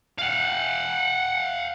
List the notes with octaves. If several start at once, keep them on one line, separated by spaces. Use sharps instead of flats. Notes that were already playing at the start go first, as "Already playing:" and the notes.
F5 F#5